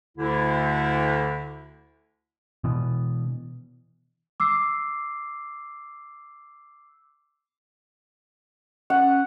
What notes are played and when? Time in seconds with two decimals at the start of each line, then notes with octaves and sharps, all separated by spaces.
0.18 D2 D3 E4
2.64 B2 E3
4.40 D6 E6 C7
8.90 C#4 F#5